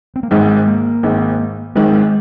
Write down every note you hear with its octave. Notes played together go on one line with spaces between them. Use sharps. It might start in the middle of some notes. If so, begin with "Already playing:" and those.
C4
A#3
G#1 G#2 D#3 G#3
A#3
G#1 G#2 D#3
G#1 G#2 D#3 G#3